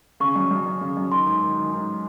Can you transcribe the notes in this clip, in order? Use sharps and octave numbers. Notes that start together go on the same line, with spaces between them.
C#3 C#6
F#2
F#2
F#2
C#3
F#2
D#3 C6
G#2
D#3
D#3
G#2